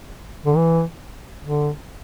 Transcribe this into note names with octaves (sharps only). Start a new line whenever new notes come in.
D3
E3
D3